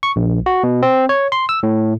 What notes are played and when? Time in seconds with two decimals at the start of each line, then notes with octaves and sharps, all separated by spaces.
0.03 C#6
0.16 A#1
0.46 F#4
0.63 B2
0.82 C4
1.09 C#5
1.32 C6
1.49 E6
1.63 A2